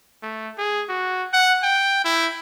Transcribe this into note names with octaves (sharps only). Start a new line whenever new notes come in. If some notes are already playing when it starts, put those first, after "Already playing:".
A3
G#4
F#4
F#5
G5
E4